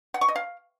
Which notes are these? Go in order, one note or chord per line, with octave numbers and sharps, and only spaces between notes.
F#5
C#6
D#5
F5